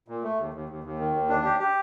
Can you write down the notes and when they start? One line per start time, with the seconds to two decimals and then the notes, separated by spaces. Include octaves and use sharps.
0.08 A#2
0.23 A3
0.38 D#2
0.54 D#2
0.69 D#2
0.84 D#2
0.99 D#3
1.14 D#2
1.29 D4
1.45 G4
1.60 G4